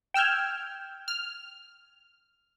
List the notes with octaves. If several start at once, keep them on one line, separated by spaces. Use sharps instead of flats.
G5 E6 F6 G6 G#6
F6